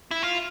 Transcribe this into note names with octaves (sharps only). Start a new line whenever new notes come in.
E4
F4